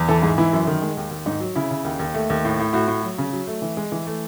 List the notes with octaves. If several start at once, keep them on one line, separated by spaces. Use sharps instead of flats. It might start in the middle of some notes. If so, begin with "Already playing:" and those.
Already playing: E2
E3 A4
G#2 G#4
E3 E4
F#2
D#3
G#3
D#2
D#2
G#2 D#4
F#3
C#3 E4
C#3
D#2
D#2
A3
D#2
A2
A2
A2 F#4
A2
F#3
C#3
F#3
A3
E3
G#3
E3
A3